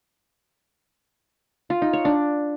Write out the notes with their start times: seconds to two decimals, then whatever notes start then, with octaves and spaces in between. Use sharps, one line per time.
1.70 F4
1.82 D#4
1.93 C#5
2.05 D4